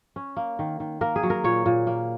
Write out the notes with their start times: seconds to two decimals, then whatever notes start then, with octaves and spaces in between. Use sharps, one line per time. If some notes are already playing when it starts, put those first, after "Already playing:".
0.16 C#4
0.37 A#3
0.59 D#3
0.80 D#3
1.01 A#3 A#4
1.16 G#4
1.23 F#3
1.30 A#4
1.44 A#2 C#5
1.66 A#2
1.87 A#3